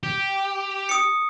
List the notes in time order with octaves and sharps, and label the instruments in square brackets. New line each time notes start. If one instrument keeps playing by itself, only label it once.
[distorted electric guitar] G4
[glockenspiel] D#6 C#7